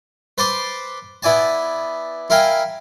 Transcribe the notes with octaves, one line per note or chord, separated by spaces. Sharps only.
B4 C5 A5 C6 D6
B3 E4 D5 G#5 A5
E4 A#4 F5 G5 G#5